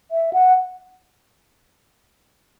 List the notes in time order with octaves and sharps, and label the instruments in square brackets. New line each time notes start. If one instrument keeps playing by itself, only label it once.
[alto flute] E5
F#5